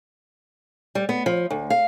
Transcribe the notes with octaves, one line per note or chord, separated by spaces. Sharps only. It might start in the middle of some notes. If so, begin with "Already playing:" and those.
G3
B3
F3
D2
F5